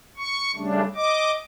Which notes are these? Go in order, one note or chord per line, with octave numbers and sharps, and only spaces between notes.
C#6
C#3 G3 A3 D4
D#5 D6